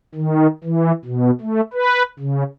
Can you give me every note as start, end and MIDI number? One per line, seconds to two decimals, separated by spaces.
0.15 0.47 51
0.64 0.92 52
1.05 1.31 47
1.41 1.61 57
1.73 2.03 71
2.19 2.44 49